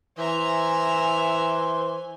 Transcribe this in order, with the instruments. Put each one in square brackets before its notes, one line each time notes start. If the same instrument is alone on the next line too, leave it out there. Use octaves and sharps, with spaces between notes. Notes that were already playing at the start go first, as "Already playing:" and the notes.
[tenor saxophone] E3 [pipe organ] C5 C6 [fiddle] E5 A#5 [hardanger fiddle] G#5